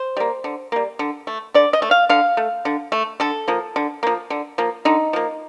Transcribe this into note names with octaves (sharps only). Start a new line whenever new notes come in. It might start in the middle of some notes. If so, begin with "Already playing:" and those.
Already playing: C5
G3 A#3
D3
G3 A#3
D3
A3
D3 D5
D#5
A3
F5
D3 F5
A3
D3
A3
D3 A4
F3 A#3
D3
F3 A#3
D3
F3 A#3
D3 D#4
F3 A#3